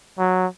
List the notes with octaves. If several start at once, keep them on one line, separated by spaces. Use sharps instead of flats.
F#3